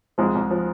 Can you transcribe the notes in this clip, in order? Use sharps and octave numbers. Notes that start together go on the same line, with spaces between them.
C2 F3 G#3
C2
F3